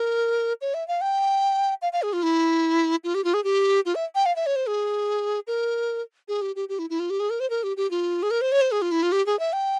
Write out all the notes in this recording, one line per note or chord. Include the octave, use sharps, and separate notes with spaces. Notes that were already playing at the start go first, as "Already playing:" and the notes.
Already playing: A#4
C#5
E5
F5
G5
F5
F5
G#4
F4
E4
F4
G4
F4
G#4
G4
F4
E5
G5
F5
E5
C#5
C5
G#4
A#4
G#4
G4
G4
G4
E4
E4
F4
G4
G#4
A#4
C5
A#4
G4
G4
F4
G#4
A#4
C5
C#5
C5
G#4
F4
E4
F4
G4
G#4
E5
G5